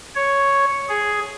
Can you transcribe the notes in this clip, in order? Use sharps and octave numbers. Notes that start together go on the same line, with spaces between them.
C#5
G#4